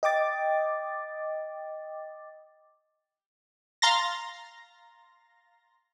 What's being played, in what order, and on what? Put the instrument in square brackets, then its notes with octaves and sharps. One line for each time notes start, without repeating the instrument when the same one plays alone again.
[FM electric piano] D#5 G5 D6 A6
[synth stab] F5 A#5 C6 A6 A#6